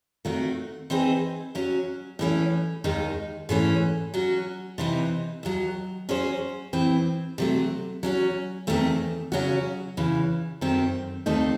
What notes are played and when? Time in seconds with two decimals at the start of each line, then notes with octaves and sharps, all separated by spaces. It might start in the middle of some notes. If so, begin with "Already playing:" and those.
0.25 D#3 A3 C4 F#4
0.90 E3 C4 D#4 G#4 C5
1.55 F#3 C#4 F#4
2.19 A2 E3 A3 C#4
2.84 D#2 D#3 G#3 D#4
3.49 G#2 E3 A3 C#4
4.14 F#3 C#4 F#4
4.78 C3 E3 C4 D#4
5.43 D#2 D#3 F#3
6.09 F#3 C#4 G#4 C5
6.73 A2 E3 C4
7.38 C3 F#3 A3
8.03 F#3 C#4 F#4
8.67 E2 D#3 A3 C4
9.32 C#3 F#3 C#4 F#4
9.97 E2 C#3 E3
10.61 F#2 D#3 A3 C4
11.26 D#2 D#3 A3 C4 D#4